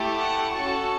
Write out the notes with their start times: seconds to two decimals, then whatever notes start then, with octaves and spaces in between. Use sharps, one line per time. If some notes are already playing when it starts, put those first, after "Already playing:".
Already playing: A3 E4 G4
0.19 F#5 A5
0.53 C#4 F#4 A4 A5 C#6